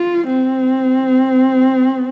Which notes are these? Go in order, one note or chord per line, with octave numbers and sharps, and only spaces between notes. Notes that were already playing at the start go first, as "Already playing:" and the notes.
Already playing: F4
C4